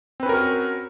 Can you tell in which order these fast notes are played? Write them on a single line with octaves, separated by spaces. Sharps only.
C4 B4 C#4 A#4 F#4